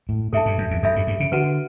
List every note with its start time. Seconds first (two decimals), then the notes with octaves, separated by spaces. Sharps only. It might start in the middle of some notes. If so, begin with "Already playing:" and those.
0.09 A2
0.33 G2 A4 E5 A5
0.46 G2
0.58 F#2
0.71 E2
0.83 F#2 A4 E5 B5
0.96 G2
1.07 G2
1.20 C#3
1.32 D3 F#4 B4 F#5